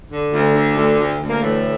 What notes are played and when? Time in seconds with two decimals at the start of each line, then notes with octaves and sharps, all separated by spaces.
0.11 D3
0.33 D2
0.54 D3
0.76 D2
0.98 D2
1.20 D2
1.30 A#3
1.41 A2 E3 A3